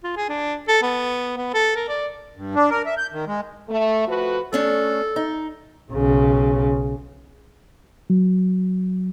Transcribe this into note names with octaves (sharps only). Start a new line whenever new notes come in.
F4
G#4
D4
A4
B3
B3
A4
A#4
D5
G2
D4
A#4
E5
G6
D#3
G#3
A3
F3 A3 F#4 B4
A3 C#4 D4 A4
D#4
B1 C#3
F#3